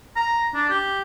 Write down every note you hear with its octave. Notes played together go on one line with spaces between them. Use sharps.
A#5
D4
G4